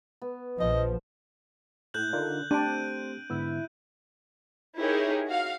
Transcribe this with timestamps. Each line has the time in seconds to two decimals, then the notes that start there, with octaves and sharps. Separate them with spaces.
0.22 B3
0.60 A#1 F3 C5 D#5
1.94 A2 F#6 G6 F#7
2.13 D3 D#4 F4 A#4
2.51 A3 C4 D4 G4 D7 D#7
3.30 G#2 D3 B3 E4
4.78 D#4 E4 G4 G#4 A#4 C#5
5.27 F#4 F5